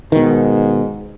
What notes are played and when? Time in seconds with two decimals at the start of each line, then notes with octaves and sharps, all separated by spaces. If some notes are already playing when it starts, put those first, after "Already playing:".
0.12 G#2 B2 D#3